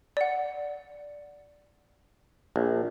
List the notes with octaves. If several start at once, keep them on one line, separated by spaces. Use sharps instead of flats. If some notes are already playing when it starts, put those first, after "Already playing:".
D5 F#5
A#1